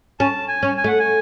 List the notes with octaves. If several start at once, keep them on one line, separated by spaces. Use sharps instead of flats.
C#4 A5
G#5
C#4
G#5
A3
F#5
G#5